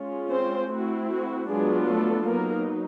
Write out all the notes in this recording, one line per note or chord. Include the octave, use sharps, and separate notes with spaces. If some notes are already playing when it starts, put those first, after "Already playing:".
Already playing: G#3 C#4 F4
C4 C5
A3 C4 E4 F#4
F#4
F#3 G#3 B3 D4 F4 G#4
A3 A4
F#3 A#3 B3 D#4 A#4